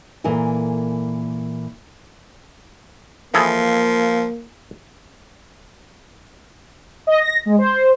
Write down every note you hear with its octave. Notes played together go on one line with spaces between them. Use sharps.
A#2 E3 A4 A#4 G#5
E3 F3 A#3 G#4 A4
D#5
A#6
G#3
C5